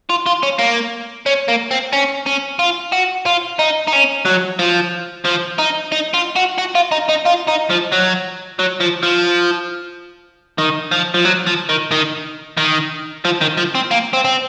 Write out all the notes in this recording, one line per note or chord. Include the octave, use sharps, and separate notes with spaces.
F4
F4
C#4
A#3
C#4
A#3
C4
C#4
C#4
F4
F#4
F4
D#4
D#4
C#4
F#3
F3
F3
D#4
D#4
F4
F#4
F#4
F4
D#4
D#4
F4
D#4
F3
F#3
F#3
F3
F3
D#3
F3
F3
F#3
F3
D#3
D#3
D#3
F3
D#3
F3
C4
A#3
C4
C4